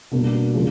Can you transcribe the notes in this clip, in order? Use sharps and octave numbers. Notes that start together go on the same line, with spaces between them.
B2 G3 A#3 D4
C#3 F3 G#3